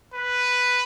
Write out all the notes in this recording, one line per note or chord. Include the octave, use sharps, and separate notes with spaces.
B4